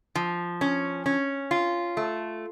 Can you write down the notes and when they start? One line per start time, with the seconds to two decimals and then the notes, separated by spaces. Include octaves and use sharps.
0.15 F3
0.61 C#4
1.06 C#4
1.51 F4
1.97 A3